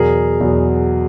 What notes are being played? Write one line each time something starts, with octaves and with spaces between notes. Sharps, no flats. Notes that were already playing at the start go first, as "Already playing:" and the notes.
Already playing: E2 B2 F#3 G#4 A#4
E2 B2 F#3